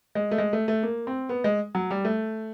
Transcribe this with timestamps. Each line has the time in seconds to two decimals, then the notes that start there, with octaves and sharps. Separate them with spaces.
0.15 G#3
0.31 A3
0.38 G#3
0.53 A3
0.68 A3
0.83 A#3
1.07 C4
1.29 B3
1.44 G#3
1.75 F#3
1.91 G3
2.05 A3